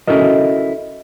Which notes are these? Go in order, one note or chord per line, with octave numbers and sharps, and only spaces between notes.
C#4 E4 F#4 A4 A#4 D#5